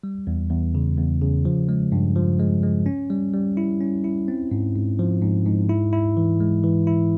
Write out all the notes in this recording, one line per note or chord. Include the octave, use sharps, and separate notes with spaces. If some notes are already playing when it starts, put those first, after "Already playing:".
G3
E2
E2
C#3
E2
C#3
F3
G#3
G2
F3
G#3
G#3
C#4
G3
G3
E4
C#4
E4
C4
G#2
G#2
F3
G#2
G#2
E4
E4
E3
G#3
E3
E4